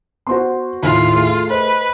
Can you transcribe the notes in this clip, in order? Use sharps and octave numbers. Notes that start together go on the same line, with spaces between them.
B3 F#4 C5 C6
D#2 A2 F4
A3 G#4
B4 C5 D#5